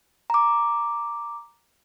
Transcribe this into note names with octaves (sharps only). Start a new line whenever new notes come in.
A#5 D6